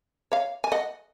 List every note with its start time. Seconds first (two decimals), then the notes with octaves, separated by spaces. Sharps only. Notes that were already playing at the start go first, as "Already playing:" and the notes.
0.32 C#5 F5
0.64 G#5
0.72 D#5 F#5